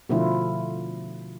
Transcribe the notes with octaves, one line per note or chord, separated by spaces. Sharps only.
B2 D3 F3 A3 E4 F4